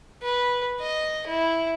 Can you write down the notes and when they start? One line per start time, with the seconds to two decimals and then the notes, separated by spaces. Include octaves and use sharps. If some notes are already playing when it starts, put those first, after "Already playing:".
0.23 B4
0.81 D#5
1.27 E4